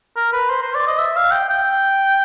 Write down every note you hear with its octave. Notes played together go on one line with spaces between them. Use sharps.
A#4
B4
C5
C5
D5
D#5
E5
F5
G5
G5